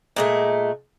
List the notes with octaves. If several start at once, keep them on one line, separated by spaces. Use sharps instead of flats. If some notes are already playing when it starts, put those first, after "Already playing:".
A#2 G#3 A3